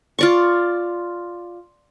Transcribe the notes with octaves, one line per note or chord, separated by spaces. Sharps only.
F4 D5 C#6